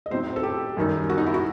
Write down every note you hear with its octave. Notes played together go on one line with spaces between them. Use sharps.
D#5
A2 F#3 C4 D#4 C5
A4
G4
F#2 D#3 G3 D#4
F#4
D#4
E4
F#4